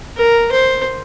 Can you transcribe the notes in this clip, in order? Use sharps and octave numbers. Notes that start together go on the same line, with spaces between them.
A#4
C5